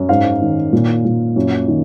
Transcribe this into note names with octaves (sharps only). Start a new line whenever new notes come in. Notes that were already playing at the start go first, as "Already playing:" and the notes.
Already playing: F#2
G#2 F5
D#3
A#2
A#2
F#2
D#3